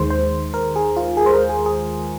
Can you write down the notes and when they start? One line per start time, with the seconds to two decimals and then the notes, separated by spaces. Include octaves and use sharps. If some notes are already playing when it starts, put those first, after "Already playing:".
Already playing: D#2 D#3 G#3 C5
0.10 C5
0.54 A#4
0.76 G#4
0.97 F4
1.17 G#4
1.26 C5
1.33 A#4
1.49 G#4
1.66 G#4